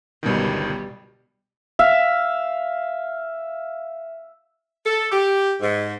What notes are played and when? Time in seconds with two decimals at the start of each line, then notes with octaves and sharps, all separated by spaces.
0.23 G1 C#2 B2 D#3 G3
1.79 E5 F5
4.85 A4
5.10 G4
5.61 G#2